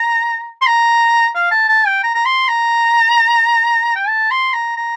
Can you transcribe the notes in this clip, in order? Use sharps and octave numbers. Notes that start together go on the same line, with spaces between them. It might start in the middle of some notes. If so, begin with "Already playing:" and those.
Already playing: A#5
C6
A#5
F5
A5
A5
G5
A#5
A#5
C6
A#5
G5
A5
C6
A#5
A#5